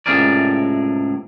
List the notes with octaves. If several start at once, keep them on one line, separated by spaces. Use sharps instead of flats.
C#2 A2 C3 G#4 A#4 D5